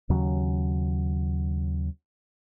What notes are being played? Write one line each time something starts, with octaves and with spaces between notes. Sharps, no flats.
D#2 C#3 F#3 C#4